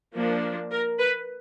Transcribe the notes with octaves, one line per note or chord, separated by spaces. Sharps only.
F3 A#3 D4
A#4
B4